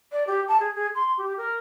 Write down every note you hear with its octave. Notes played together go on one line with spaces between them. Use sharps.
D5
G4
A5
G#4
G#4
C6
G4
A#4